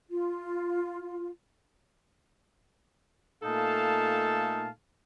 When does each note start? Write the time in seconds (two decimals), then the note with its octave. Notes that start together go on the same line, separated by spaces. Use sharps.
0.09 F4
3.43 A#2 A3 D#4 A4 F5 A5